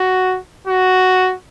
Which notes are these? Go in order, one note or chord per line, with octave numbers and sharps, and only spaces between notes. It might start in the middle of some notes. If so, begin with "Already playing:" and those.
Already playing: F#4
F#4